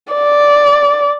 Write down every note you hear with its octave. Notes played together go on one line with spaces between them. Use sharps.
D5